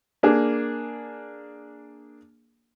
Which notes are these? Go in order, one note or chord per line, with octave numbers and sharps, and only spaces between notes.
A#3 D4 G#4